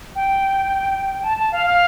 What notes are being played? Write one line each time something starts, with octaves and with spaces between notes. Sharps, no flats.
G5
A5
A5
F5
F5